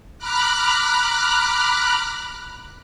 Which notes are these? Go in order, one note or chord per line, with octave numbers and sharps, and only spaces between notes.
A#5 B5 D6 F6 F#6